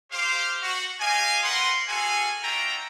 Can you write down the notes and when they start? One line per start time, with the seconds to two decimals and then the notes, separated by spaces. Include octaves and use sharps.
0.12 G4 C5 F5
0.62 F#4
1.00 G4 D#5 F5 G#5
1.44 A#3 A#4 B4 F#5 C6
1.88 F#4 G#4 A4 F5 G#5
2.43 D4 F4 F#4 E5 G5 A#5